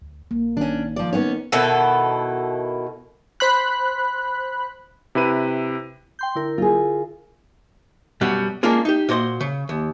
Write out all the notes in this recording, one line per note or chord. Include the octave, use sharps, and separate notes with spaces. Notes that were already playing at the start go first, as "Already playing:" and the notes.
D2
A#1 A#3
D#3 C#4 D4
F3 D5
B3 C#4 D#4 A#4 C#5
B2 D#3 E4 A4
C5 B5 F#6
C3 E4 B4 D#7
G5 C6 G6
D3 E4 A#4
F4 G#4
F#2 B2 F#3 G3
G#3 A#3 C#4 D4 F4 G#4
D#4 G4
A#2 F#4 C5 C#5 D#5
C#3
D#2